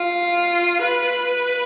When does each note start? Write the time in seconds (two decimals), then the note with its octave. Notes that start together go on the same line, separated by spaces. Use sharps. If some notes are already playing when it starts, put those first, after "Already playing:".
Already playing: F4
0.82 B4